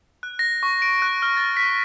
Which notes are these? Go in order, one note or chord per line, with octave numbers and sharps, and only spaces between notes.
F#6
A#6
C#6
D7
F#6
F6
A6
B6